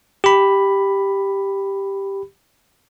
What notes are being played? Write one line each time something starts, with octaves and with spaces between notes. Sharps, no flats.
G4 B5